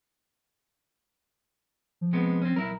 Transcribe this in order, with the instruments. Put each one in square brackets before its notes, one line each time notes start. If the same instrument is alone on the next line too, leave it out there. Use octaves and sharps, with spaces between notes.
[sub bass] F3
[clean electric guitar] C3 G#3 B3
C4 C#4
[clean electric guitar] B1 E4 A#4 [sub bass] F#3